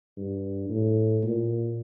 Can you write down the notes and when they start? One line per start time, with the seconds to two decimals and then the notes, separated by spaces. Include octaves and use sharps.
0.17 G2
0.70 A2
1.24 A#2